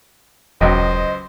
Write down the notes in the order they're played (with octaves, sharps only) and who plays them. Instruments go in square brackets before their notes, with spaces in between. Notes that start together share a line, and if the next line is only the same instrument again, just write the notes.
[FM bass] E1 [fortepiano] C#2 F#3 G5 [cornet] C5 [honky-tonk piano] D#5